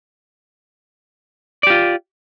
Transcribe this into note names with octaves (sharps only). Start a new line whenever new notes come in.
F4 G4 D5